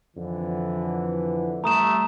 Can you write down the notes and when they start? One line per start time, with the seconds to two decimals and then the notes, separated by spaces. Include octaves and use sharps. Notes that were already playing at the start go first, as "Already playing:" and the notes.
0.17 F2 D3 E3
1.64 G3 A3 A#5 D#6 E7